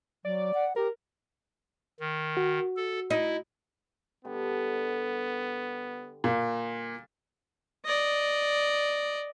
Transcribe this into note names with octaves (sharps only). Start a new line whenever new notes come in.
F#3 D5
F#5
G4 A#4
D#3
F#4
A4
D#4 E4
D3 G3 B3 G4
A#2
D5 D#5